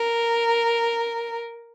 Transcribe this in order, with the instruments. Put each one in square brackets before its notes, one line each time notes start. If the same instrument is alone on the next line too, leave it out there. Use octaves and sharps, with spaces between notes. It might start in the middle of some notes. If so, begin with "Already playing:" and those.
Already playing: [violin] A#4